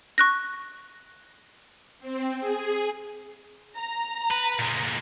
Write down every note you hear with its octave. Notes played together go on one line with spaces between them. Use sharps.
C#6 F#6 A#6
C4
G#4
A#5
B4
A#2 G#3